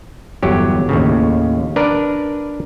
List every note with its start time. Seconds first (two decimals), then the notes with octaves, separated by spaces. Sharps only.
0.43 G1 E2 F#3 G4
0.89 D#2 A2 C#3
1.76 D4 A#4 B4 D5